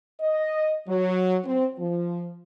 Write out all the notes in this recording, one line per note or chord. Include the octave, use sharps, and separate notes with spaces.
D#5
F#3
C4
F3